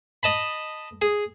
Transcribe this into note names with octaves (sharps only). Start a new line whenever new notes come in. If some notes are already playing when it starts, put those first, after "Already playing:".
D#5 A5 B5
G#4